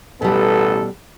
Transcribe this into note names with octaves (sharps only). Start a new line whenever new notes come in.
A1 B2 G3 B3 A4